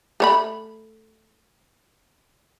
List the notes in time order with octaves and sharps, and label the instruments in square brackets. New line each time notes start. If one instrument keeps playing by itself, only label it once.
[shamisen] A3 C#5 B5